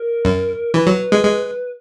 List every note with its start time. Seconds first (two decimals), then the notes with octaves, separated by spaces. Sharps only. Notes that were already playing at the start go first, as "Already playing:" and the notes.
Already playing: A#4
0.25 F#2
0.74 E3 B4
0.87 F#3
1.12 G#3
1.24 G#3